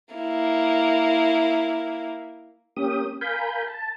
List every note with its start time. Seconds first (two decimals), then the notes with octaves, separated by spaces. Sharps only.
0.14 A#3 E4
2.77 A#3 C#4 G4 D#6
3.21 A#4 F5 G#5 B5 G6
3.67 A5